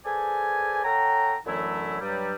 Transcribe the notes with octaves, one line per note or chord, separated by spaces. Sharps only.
G#4 A4 B4 C5 D5 G#5
A4 C#5 F#5 G5 A#5
F#2 D3 E3 F#3 A3 E4
G2 F#3 G3